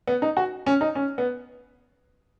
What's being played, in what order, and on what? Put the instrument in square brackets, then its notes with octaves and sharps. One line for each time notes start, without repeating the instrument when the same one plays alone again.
[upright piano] B3
D#4
F#4
C#4
D#4
C#4
B3